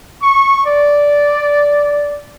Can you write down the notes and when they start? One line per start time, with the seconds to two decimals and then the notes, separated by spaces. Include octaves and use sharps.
0.23 C#6
0.65 D5